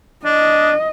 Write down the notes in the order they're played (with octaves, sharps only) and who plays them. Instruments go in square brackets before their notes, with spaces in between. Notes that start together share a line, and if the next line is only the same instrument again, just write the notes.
[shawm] D4 [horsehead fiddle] D#5